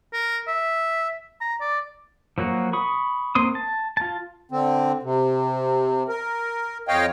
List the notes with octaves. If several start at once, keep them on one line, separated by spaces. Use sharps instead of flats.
A#4
E5
A#5
D5
F3 F#3 A#3 F#4
B5 C#6 D#6
A#3 C4 C6 D#6
A5
F4 A5
D3 C4
C3
A#4
F2 C#5 D#5 F5 G5